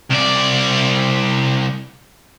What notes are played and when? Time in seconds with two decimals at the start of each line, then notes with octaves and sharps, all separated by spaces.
0.10 C2 D5